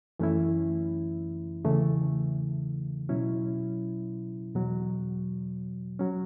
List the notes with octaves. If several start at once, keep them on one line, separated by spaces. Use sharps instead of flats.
F#2 E3 A3 C#4 E4
E2 C#3 E3 A3
B2 F#3 C#4 E4
E2 B2 F#3
F#3 C#4